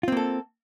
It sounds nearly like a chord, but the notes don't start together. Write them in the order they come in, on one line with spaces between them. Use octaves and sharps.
F4 C4 A#3 A4